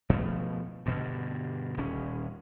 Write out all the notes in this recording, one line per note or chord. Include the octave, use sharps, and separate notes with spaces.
B2 F3 G#3 A3
G2 B2 D3
D#1 C#4